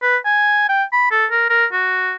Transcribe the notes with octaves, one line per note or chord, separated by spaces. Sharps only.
B4
G#5
G5
B5
A4
A#4
A#4
F#4